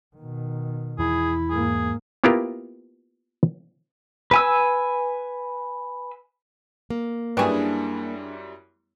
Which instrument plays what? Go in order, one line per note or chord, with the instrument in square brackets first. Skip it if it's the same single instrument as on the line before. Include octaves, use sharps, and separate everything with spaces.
[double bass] B2 D#3
[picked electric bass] E2 [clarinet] E4 [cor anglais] G#4
[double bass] G#2 A#3 [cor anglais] G#4
[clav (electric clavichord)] A#3 B3 E4 F4 G4 A#4
[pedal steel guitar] B4 G#5 E6
[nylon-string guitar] A#3
[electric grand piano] F#2 G3 E4 [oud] D4 G#4 [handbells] B4 G5 C#6